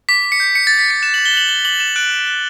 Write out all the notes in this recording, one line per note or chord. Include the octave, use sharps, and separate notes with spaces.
D6 B6
D6
C#7
G6
G6 C#7
A6
G6
B6
G6 C#7
F#6 E7
F#7
D6
G7
F#6 F#7
F#6 G7
D6 F#7
F#6 E7
F#6 D7
F#6
F#6